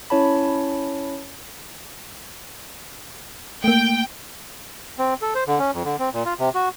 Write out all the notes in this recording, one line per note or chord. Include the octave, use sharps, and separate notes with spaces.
C#4 E4 C#5 A5 B5
A3 A#3 G5
C4
A4
C5
D3
C#4
F2
D3
C4
A#2
F4
C3
F#4